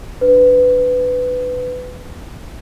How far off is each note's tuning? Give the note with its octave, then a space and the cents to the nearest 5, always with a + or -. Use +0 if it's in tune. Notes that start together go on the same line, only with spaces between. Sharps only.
D4 +0 B4 +20